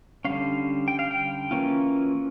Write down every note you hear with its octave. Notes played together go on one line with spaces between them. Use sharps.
D3 G3 C#4 F5
G5
F5
G5
E3 A#3 C#4 F4